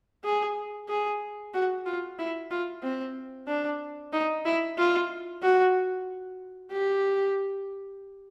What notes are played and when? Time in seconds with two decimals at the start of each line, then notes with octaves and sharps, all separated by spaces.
0.24 G#4
0.89 G#4
1.54 F#4
1.86 F4
2.19 E4
2.51 F4
2.83 C4
3.47 D4
4.13 D#4
4.45 E4
4.78 F4
5.42 F#4
6.71 G4